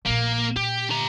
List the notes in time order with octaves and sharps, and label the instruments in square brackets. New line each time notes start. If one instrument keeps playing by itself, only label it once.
[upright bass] A#1 A#2 [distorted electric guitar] A#3
[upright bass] A#2 [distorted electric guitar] G4
[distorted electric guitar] G4 A#5